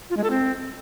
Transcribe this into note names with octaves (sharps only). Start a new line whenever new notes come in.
F4
G#3
A4
C4